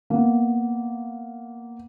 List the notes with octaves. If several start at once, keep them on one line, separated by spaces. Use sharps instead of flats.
A#3 B3